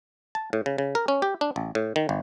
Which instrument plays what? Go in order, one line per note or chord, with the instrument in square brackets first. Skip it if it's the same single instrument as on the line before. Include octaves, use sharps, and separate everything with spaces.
[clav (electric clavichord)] A5
A2
C#3
C#3
A#4
C#4
G4
D4
A1
A2
D#3
G1